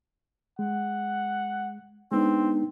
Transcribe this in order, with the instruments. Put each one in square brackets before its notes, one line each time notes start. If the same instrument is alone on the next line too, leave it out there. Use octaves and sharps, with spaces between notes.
[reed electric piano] G#3 [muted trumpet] F#5
[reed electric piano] G#3 B3 D4 [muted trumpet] C4 [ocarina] D#4